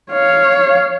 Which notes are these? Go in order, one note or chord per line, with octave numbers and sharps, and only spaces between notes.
C#5 F5